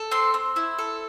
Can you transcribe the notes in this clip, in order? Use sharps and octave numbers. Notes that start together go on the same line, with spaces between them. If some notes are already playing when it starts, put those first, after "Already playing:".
Already playing: A4
C4 C6
C4
E4
A4